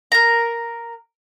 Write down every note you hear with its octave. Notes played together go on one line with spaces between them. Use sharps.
A#4 A#5